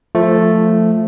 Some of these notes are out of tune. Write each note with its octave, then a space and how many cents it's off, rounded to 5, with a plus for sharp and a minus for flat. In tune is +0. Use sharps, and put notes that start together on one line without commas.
F3 +10 A3 +0 F4 -30